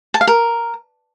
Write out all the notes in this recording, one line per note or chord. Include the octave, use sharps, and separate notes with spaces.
A5
F5
A#4